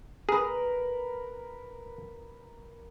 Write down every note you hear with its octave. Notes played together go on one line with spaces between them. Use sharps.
G#4 A#4 B4